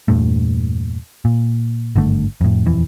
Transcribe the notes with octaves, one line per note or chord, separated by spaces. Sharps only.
E2 G2 A#2 A3
A#2
G#1 G2 D3 A3
F2 A2
D#1 F2 E3